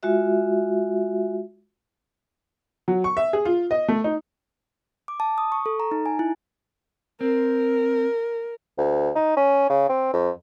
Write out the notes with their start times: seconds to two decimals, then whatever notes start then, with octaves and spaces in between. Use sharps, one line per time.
0.03 G#3 F4 F#4 E5
2.88 F#3
3.04 C#6
3.17 E5
3.33 G#4
3.45 F4
3.71 D#5
3.88 A3
4.04 D#4
5.08 D6
5.20 A5
5.38 D#6
5.52 C#6
5.66 A4
5.80 A#5
5.91 D#4
6.06 G#5
6.19 E4
7.21 C4 A#4
8.78 D2
9.15 D#4
9.37 C#4
9.69 C#3
9.89 C4
10.13 F2